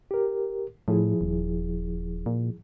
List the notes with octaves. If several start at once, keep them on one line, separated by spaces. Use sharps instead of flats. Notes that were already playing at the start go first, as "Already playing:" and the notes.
G4 A#4
A2 F3 E4 G#4
D#1
A#2